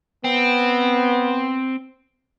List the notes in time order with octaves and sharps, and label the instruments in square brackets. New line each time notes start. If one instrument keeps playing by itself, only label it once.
[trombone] B3 [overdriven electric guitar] C4